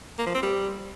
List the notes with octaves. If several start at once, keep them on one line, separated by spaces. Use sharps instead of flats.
A#3
F3
C4
G3